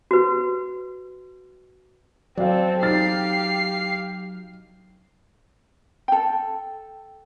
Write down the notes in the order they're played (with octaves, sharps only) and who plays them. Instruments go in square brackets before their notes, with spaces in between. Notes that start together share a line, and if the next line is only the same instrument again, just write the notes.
[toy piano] F#4 B4
[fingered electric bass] F#3 [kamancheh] C4 A4 [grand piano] D5 F5
[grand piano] D#4 F6 A6 [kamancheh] G4 [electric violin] F5 C7
[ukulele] A4 G5